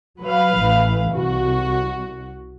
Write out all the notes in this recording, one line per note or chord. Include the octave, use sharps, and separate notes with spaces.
F#3 B4 F5
A1 E3
C2 F#4